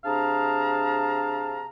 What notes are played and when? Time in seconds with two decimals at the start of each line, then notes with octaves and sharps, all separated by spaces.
0.05 C3 D4 G#4 F5 A5 A#5